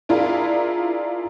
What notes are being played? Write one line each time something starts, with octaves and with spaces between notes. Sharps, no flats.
D4 E4 F4 G#4 A#4 F5